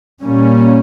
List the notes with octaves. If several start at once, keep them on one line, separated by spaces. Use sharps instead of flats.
A#2 G3 A#3 C#4